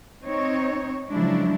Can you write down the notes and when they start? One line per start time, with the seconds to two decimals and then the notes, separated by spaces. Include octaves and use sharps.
0.24 C4 D#4 C#5
1.11 C#3 F3 F#3 G#3 D4 E4